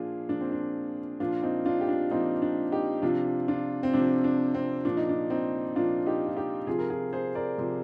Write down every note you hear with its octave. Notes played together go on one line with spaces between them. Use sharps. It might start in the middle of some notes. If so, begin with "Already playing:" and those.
Already playing: A#2 F3 D4 F4 G#4
A#2 F3 D4
C4
D4
A#2 F3 D4 F4
C4 D#4
D4 F4
G4
D4 F4
A#2 F3 C4 D#4
D4
D#4 G4
C3 F3 D4 F4
D4 F4
C4
C3 F3 D4
D4
C4
A#2 F3 D4
D#4
D4
C4 D#4
A#2 F3 D4 F4
D#4 G4
F4
D#4 G4
C3 F3 F4 G#4
A#4
F4 G#4
G#4 C5
A#4 D5
C3 F3